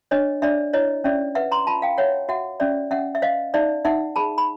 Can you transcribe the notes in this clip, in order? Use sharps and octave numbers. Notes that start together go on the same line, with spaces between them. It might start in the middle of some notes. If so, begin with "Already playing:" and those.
D4 C#5 D#5
D4 D5 E5
E4 C#5 D#5
C#4 D5 E5
B4 E5 F#5
A#5 C6
F4 A5 B5
F5 G5
C#5 E5 F#5
F#4 E5 F#5
C#4 D5 E5
C#4 E5 F#5
E5
C5 D#5 F5
D#4 D5 E5
D#4 E5 F#5
G#4 A5 B5
B5